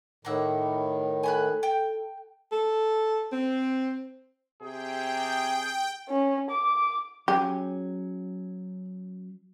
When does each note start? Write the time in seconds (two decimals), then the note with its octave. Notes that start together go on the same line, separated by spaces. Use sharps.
0.25 A2 D#3 A#3 F#5 E6
1.23 A4 G#5 B5 F#6
1.63 G5
2.52 A4
3.32 C4
4.62 C3 G#4 G5
6.09 C#4
6.51 D6
7.28 F#3 C#4 G4 G#4